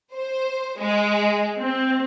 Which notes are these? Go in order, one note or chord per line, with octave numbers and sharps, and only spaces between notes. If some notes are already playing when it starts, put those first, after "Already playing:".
C5
G#3
C4